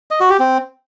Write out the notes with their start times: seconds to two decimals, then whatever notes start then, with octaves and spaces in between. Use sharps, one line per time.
0.11 D#5
0.20 F#4
0.30 G4
0.39 C4